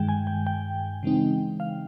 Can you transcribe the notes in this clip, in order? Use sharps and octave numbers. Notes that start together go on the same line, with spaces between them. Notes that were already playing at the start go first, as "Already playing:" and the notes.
Already playing: G2 D#3 G#3 G5
G#5
G5
G5
C#3 E3 G#3 C4 D#4
F5